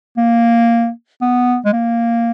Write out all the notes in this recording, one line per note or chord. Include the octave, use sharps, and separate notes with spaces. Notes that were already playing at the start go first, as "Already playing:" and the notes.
A#3
B3
G#3
A#3